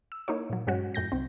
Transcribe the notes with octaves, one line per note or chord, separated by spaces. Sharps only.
E6
A#3 D#4 E4 C#5
A#2 F#3
G2 G#3 C#4 F#4
F#2 A2 G6 A#6
C2 C4